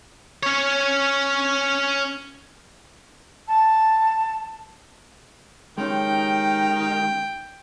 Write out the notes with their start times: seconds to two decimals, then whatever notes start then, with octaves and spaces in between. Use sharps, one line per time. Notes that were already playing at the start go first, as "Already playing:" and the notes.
0.43 C#4 C#5
3.47 A5
5.78 D#3 G#3 C#4 G4 G5